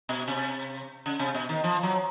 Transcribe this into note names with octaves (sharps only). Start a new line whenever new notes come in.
B2
C3
C#3
C3
B2
D#3
F3
F#3